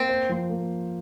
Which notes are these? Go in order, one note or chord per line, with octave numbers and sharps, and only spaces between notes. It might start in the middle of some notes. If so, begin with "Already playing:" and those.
Already playing: A#3 C4
C5
F3
A#3